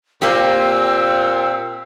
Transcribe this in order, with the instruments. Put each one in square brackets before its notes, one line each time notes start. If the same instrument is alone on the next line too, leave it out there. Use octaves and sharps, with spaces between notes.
[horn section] A#2 C4 [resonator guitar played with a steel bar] A#3 G4 [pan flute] E6